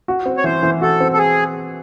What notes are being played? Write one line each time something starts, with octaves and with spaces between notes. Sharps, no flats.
F#4
C4
C#5
E3 C5
E3
F#4 A4
C4
A4
G#4